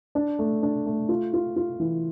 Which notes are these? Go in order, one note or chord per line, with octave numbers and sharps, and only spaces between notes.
D4
A3
D4
A3
F4
F4
F4
E3